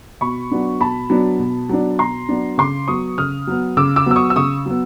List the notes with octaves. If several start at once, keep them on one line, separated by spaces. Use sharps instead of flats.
B2 B5 C#6
F#3 B3 D4
B2 A5 B5
F#3 B3 D4
B2
F#3 B3 D4
B2 A#5 C6
F#3 B3 D4
C#3 C6 D6
F#3 B3 C#6 D#6
C#3 D#6 F6
F#3 B3
C#3 D6 E6
D6 E6
F#3 B3 E6
C#6 D#6
E6
C#3 C#6 D#6
F#3 B3